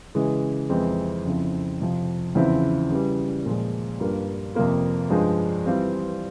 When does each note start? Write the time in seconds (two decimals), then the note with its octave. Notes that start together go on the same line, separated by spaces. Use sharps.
0.15 C#3 E3 G#3
0.70 F2 E3 G#3 C4 E4
1.25 F2 C#3 F3 C4 E4
1.81 F2 C3 F3
2.35 E2 C#3 F3 C4 E4
2.90 C#3 E3 G3
3.46 A#2 F3 G#3
4.00 G2 G3 A#3 F4
4.55 F2 C3 F3 A#3 F4
5.10 G2 F3 G#3
5.66 E3 G3 C4 F4